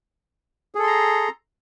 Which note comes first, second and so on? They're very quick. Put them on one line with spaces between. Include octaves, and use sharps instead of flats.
G#4 A4 C6 A#5